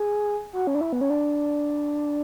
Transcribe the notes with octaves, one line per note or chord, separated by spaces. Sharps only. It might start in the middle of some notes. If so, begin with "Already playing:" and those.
Already playing: G#4
F#4
C#4
D4
E4
B3
C#4
D4